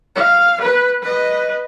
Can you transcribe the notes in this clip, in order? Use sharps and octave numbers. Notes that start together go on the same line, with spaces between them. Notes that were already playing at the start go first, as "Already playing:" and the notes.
F5
B4
B4 D#5